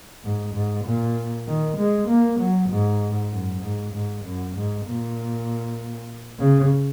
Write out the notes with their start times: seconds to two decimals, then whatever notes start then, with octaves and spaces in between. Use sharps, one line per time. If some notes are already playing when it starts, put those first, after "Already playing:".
0.24 G#2
0.54 G#2
0.85 A#2
1.47 D#3
1.77 G#3
2.08 A#3
2.40 F#3
2.70 G#2
3.32 F#2
3.62 G#2
3.94 G#2
4.25 F#2
4.56 G#2
4.86 A#2
6.40 C#3